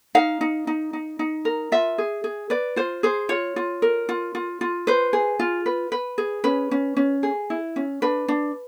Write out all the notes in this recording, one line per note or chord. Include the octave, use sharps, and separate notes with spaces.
D#4 F5
D#4
D#4
D#4
D#4
A#4
F4 E5
G#4
G#4
B4 D5
F4 C5
G#4 C5
F4 C#5
F4
A#4
F4
F4
F4
B4 C5
G#4
F4
B4
B4
G#4
C#4 B4
C#4
C#4
G#4
E4
C#4
D4 B4
D4